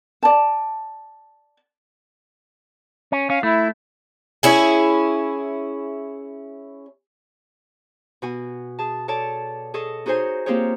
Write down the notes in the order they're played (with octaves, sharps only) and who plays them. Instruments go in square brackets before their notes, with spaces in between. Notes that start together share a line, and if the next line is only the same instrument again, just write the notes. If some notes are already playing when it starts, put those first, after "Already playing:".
[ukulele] D5 A5
[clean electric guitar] C#4
[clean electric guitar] C#4 [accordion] F5
[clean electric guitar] A3 [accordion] E4
[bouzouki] C#4 E4 G#4
[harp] B2 F#4 G#5
G#4 A5
A4 C#5 D5 A5
G#4 A4 D#5 C#6
D#4 F#4 G#4 C5 C#5 G#5
A#3 C4 F4 G4 G#4 C#5